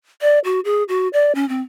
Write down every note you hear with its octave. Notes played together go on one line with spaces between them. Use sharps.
D5
F#4
G#4
F#4
D5
C#4
C4